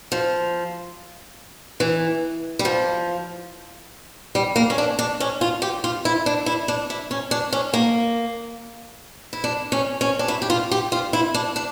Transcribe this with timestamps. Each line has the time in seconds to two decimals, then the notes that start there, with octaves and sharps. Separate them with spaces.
0.12 F3
1.80 E3
2.59 G3
2.65 F3
4.35 G3
4.56 A#3
4.70 C#4
4.78 D4
4.99 D4
5.20 C#4
5.41 F4
5.62 G4
5.84 F4
6.05 E4
6.26 D4
6.46 E4
6.68 D4
6.90 E4
7.11 C#4
7.31 D4
7.53 C#4
7.74 A#3
9.33 E4
9.44 D4
9.72 C#4
10.01 C#4
10.19 D4
10.28 E4
10.42 G4
10.50 F4
10.71 G4
10.92 F4
11.13 E4
11.34 D4
11.56 D4